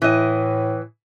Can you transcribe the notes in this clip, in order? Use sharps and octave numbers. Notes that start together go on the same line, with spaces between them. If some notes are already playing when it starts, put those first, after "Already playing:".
A2 E3 D#5